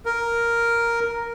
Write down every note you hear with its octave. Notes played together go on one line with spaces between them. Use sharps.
A#4